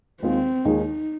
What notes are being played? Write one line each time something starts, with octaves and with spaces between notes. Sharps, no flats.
D#2 D#3 G#3 C4 F4 G#4
D#2 D#3 G#3 D#4 F4 G#4